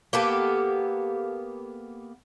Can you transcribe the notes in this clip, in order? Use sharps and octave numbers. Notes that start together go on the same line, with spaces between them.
A#3 B3 G4 A4